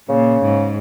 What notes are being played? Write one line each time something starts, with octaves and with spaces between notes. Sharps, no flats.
A#2 C#3
G#2